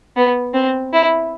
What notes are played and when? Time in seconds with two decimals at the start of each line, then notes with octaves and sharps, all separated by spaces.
0.16 B3
0.54 C4
0.93 E4